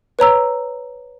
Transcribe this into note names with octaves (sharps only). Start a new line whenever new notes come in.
B4 C#5 A#5 E6